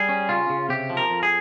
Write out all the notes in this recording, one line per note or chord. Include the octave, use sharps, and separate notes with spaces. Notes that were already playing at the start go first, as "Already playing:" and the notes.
Already playing: G3 G#4
C#4
C#3 F4
C#3
C3 G4
F3
A#4
F2
G#4